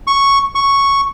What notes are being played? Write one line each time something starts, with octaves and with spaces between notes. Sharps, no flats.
C#6
C#6